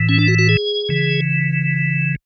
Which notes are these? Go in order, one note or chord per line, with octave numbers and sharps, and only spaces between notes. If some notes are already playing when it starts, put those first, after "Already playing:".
Already playing: A2 E3
C#4
D4
F#4
F#4
G#4
C#3 E3